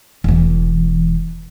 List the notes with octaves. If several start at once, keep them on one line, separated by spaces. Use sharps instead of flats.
E1 E3